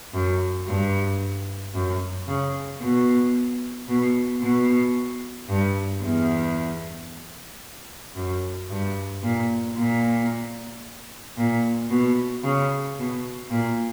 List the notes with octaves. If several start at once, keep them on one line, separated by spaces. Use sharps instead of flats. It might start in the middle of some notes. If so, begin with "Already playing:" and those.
F#2
G2
F#2
C#3
B2
B2
B2
G2
E2
F#2
G2
A#2
A#2
A#2
B2
C#3
B2
A#2